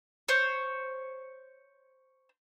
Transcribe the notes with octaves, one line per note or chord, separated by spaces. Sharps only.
C5 C#5